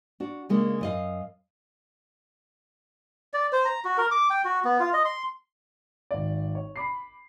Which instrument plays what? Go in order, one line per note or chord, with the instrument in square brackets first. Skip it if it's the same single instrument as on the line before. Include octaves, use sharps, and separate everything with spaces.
[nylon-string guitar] D4 F#4
C#3 G#3 A#3 D4
F#2 D#5 F5
[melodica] D5
C5
A#5
F#4
A#4
D6
G5
F#4
B3
F4
D#5
C6
[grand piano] G#1 D5
C#5
B5 D6 C7